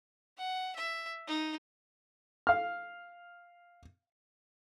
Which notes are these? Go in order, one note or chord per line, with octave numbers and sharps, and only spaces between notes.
F#5
E5
D#4
F5 F6